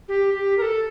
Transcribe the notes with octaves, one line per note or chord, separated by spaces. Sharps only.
G4
G4
A#4
A4